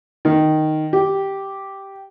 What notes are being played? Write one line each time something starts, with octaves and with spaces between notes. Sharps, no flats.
D#3
G4